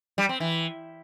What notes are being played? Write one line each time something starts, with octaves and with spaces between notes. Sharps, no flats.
G3
C4
E3